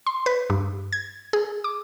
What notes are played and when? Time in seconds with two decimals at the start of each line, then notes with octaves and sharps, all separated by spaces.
0.07 C6
0.26 B4
0.50 G2
0.92 G#6
1.33 G#4
1.64 D6